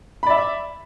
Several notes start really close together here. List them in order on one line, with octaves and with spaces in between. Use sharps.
B5 D5 E5